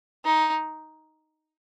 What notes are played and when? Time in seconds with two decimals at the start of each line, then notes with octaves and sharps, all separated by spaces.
0.25 D#4